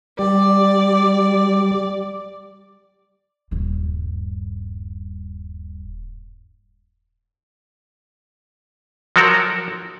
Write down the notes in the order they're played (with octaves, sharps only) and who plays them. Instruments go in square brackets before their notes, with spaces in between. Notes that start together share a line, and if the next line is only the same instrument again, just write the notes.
[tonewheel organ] G3 [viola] D5
[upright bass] D#1 G2
[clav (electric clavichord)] F3 F#3 F#4 A4 A#4